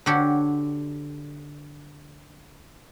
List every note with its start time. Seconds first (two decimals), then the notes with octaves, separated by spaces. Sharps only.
0.06 D3 F#4 G4 A4 C#5